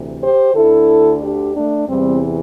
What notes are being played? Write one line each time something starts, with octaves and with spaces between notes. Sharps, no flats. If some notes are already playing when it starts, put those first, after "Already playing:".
Already playing: D2 C3 E3
G4 C5
D2 D3 E4 A4
D4 G4
A3 D4
E2 C3 E3 G3 C4